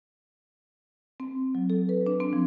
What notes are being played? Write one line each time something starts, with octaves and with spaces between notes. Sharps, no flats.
C4
F#3
A4
B4
D4
C4
F3